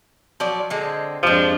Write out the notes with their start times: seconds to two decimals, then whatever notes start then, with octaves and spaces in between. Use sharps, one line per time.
0.40 F3 F#3 D5
0.70 D3 G#3 C4
1.23 F2 F3 G#3 D4 G4